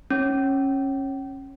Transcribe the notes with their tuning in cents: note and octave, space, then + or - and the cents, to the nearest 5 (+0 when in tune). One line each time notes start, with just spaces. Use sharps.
C#4 -20